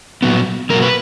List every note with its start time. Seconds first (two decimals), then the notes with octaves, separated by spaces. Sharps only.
0.22 A#2 F#3 B3
0.70 B2 F#3 A#3 A#4
0.82 B4